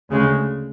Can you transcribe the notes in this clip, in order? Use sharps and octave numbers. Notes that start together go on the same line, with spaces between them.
D2 C#3 G#3